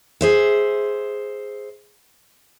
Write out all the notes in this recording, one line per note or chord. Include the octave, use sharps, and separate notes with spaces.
G#4 C5 E5